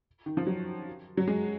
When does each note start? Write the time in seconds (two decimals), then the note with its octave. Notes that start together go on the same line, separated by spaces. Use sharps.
0.26 D#3
0.37 F3
0.47 F#3
1.17 F#3
1.27 G#3